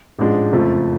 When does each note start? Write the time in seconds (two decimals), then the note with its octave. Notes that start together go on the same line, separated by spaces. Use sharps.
0.18 A1 G#2 F3 G#3 D4
0.53 F#1 F2 F3 A3